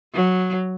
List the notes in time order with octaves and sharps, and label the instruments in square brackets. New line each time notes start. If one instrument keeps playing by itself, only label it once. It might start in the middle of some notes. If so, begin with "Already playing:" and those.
[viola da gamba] F#3